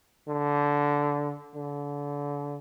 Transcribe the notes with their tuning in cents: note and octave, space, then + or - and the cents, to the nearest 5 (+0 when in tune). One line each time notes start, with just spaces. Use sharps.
D3 -15
D3 -30